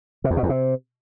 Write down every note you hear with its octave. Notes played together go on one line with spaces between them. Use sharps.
C3
E2
B2
E2
C3